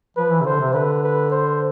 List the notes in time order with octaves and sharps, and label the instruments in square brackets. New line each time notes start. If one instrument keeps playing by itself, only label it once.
[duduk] F3 [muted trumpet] B4
[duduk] E3
C3
[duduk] D3 [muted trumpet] C5
[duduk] C3
[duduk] D3 [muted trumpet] B4
[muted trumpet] B4
C5